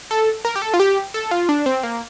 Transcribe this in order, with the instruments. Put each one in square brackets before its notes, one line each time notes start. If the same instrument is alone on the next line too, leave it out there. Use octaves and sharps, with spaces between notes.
[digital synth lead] A4
A#4
G4
A4
F4
G4
A4
F4
D4
C4
A#3